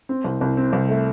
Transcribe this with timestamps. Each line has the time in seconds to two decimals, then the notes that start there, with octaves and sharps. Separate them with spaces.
0.09 C4
0.24 C2
0.41 C2
0.57 C4
0.73 C2
0.89 A3